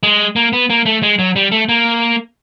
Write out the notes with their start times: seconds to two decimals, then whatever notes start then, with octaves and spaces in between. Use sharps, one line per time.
0.03 G#3
0.36 A#3
0.53 B3
0.70 A#3
0.86 A3
1.03 G#3
1.19 F#3
1.36 G3
1.52 A3
1.69 A#3